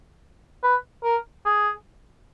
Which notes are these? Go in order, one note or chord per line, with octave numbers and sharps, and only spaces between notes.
B4
A#4
G#4